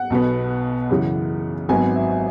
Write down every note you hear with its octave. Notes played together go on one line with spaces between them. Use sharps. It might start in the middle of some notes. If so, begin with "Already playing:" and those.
Already playing: F#5
B1 B2 B3
F#2 C#3 E3
G#1 G#2 F#3 B3 G#5
E5